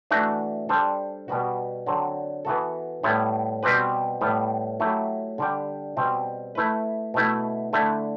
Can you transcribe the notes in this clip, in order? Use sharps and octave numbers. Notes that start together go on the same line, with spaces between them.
E3 A3 D4 F#4
G3 D4 A4 C5
B2 G3 B3 F#4
D3 F#3 C4
E3 B3 F#4 A4
A2 G3 B3 E4
B2 G3 C4 G4 B4
A2 G3 B3
F#3 A3 E4 G4
D3 G3 D4 G4
B2 G3 C4
A3 E4 B4
B2 A3 E4
D3 A3 E4